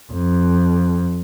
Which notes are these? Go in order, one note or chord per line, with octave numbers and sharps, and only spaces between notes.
F2